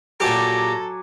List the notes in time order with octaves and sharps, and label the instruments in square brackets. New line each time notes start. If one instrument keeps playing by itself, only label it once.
[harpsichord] A#2 G4 [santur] F#3 G#5 D6 [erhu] A4 [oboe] A#5